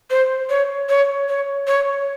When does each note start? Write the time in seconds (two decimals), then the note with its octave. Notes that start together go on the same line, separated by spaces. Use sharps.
0.10 C5
0.49 C#5
0.89 C#5
1.28 C#5
1.67 C#5